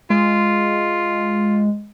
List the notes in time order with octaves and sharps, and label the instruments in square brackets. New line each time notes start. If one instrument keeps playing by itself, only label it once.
[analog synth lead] G#3 [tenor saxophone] F4